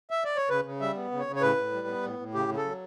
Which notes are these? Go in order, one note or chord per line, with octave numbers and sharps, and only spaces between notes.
E5
D5
C#5
C#3 B4
C#3
G3 E5
B3
C#3
C#5
C#3
C#5
A2 B4
A2
G3
B3
A2
A2
C#3 G4
C#3
A4
F#3